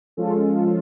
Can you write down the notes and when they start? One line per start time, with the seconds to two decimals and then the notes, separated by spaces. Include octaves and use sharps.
0.17 F3 G#3 C#4 F4 A4